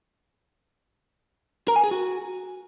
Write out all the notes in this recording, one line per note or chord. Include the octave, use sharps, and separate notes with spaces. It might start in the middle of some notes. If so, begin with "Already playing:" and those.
A#4
G#5
G#4
F#4